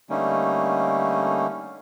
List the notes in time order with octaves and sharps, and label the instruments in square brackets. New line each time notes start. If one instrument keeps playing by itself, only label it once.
[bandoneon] D3 G3 A3 A#3 C#4 D#4